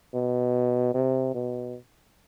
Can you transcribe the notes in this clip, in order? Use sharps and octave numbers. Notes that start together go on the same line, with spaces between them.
B2
C3
B2